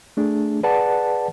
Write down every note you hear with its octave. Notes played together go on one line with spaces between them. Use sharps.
A3 D4 G#4
G#4 B4 D5 F#5 A5